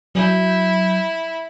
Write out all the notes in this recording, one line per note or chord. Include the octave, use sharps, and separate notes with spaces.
F#3 E4 G6